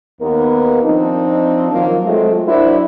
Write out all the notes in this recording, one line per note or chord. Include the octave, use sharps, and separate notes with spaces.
D#2 B3 A#4
F3 C4 D4 D#4
D#3 F3 F#3 A#3 F4
F#3 G#3 A3 C4 F4
F#3 D4 E4 F#4 A#4 C5